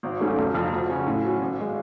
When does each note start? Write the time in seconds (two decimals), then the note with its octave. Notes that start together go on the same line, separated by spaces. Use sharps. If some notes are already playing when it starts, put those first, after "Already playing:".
0.03 G#1
0.20 G#2 F#3 A3 C#4
0.38 F1
0.54 F2 F3
0.72 D2
0.89 C#3 F#3 C#4 F#4
1.06 A2
1.24 F#3 C#4
1.41 G#1
1.61 G#3